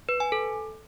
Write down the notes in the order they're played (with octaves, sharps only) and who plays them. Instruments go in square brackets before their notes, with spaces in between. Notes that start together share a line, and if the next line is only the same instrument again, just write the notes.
[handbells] B4
G#5
A4